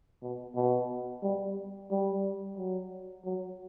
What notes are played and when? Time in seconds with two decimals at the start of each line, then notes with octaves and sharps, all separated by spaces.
0.23 B2
0.56 B2
1.23 G3
1.91 G3
2.57 F#3
3.25 F#3